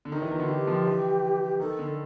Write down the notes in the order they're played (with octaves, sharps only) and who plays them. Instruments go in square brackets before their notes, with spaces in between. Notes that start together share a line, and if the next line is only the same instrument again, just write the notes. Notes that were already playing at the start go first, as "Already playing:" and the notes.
[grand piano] D3
[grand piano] D#3 [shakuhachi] D4
[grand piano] E3 [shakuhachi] E4
[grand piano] D#3 [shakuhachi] F4
[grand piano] D3 [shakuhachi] F#4
[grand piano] D#3 [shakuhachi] G4
[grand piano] F3
E3
[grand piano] D#3 [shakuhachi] A4
[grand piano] D3